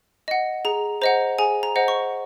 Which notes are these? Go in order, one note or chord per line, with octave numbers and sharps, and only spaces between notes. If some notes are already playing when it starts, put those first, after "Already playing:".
D#5 F#5
G#4 A#5
C5 D#5 F#5 A#5
G#4 G#5
A#5
C5 D#5 F#5
C#6